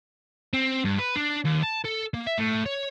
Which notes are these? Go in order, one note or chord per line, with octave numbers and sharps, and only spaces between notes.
C4
G2
B4
D4
D#2
A5
A4
A#3
E5
A2
C#5